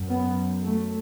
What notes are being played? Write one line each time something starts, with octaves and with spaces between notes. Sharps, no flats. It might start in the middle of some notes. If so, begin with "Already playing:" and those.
Already playing: F#2
B3
A3